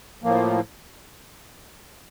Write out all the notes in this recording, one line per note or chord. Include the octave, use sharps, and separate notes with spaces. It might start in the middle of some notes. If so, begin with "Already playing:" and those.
A2 F3 A#3